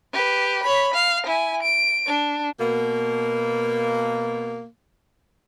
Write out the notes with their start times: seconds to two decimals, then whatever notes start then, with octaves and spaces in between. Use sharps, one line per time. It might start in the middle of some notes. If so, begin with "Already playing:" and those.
0.13 G4 B4
0.63 C#5 B5
0.94 F5
1.26 E4 G#5
1.63 D7
2.07 D4
2.59 B2 A#3